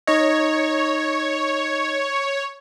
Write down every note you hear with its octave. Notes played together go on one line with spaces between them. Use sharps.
D#4 C#5 D#5